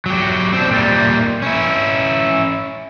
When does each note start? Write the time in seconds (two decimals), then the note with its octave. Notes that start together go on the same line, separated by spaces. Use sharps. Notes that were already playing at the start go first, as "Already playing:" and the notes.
0.06 F#3 G4
0.53 C4 D4
0.71 A#2 G3
1.42 C#4 E4